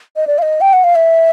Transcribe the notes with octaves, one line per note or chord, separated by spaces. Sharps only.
D#5
D5
F5
D#5
G5
F#5
F5
E5